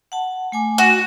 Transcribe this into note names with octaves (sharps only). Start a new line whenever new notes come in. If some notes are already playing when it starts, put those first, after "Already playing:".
F#5 A5
A3 G#5 D6
F#4